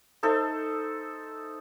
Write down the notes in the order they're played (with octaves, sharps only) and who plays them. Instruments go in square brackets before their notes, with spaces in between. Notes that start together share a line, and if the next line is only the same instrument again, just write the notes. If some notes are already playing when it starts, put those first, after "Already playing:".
[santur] D#4 A4 C5 E5